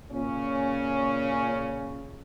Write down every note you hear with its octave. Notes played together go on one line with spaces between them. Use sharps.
A#2 C#3 C#4